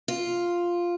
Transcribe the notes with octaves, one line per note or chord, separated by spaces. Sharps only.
F4